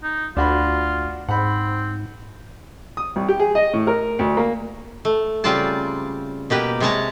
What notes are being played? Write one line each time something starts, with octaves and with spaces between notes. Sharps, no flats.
D#4
D2 D4 F4 F#4 B5
G#2 C4 F#5 B5
D#6
C2
G4
G#4
D#5
A2
A#4
D2
A#3
A3
C#3 G3 C4 F4 D5 A5
B2 A#3 G4 B4
C3 G#3 C#5 A5 A#5